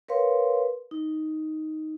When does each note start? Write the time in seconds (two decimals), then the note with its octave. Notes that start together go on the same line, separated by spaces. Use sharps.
0.09 A#4 B4 C#5 F5 C6
0.91 D#4